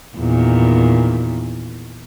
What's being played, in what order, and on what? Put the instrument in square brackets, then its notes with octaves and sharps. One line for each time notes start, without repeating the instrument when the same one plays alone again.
[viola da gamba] E2 A#2 D#3